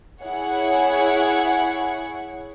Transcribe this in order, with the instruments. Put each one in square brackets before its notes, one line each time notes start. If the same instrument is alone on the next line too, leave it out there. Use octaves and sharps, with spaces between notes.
[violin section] E4 G#4 C#5 F#5